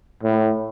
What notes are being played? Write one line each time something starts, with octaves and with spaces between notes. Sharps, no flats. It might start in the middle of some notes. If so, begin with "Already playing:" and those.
A2